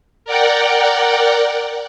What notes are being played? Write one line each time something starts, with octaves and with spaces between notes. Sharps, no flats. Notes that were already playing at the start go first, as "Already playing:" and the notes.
A#4 D5 F#5 G5